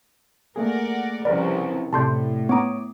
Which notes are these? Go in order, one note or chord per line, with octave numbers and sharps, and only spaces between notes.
A3 A#3 G#4 A#4 D5 F#5
C2 C#3 F3 A#4 B4 D5
A2 C3 A4 D5 A5 C6 G6
B3 C#5 A#5 D6 D#6